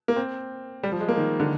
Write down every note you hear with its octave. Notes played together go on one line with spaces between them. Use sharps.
A#3
C4
G3
F3
G#3
A#3
D#3
D3